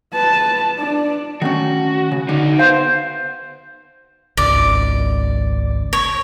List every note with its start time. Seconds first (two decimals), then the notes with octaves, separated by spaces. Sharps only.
0.13 B4 A5
0.79 D4
1.42 D#3 A3 C#4 F#4
2.12 C#3
2.29 D3 D#4 F#4
2.59 B3 C5 F5
4.37 G#1 C#2 D5
5.93 C#5